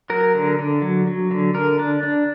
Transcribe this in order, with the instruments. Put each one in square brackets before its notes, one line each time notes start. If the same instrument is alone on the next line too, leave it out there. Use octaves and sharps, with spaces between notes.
[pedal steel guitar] F#3 A#4
D3
D3
F#3
F#3
D3
D3 A#4
D4
D4